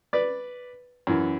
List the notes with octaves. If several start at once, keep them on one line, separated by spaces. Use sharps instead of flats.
B4 D5
F#2 E3